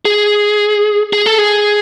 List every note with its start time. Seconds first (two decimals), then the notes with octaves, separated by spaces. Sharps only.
0.05 G#4
1.13 G#4
1.26 A4
1.38 G#4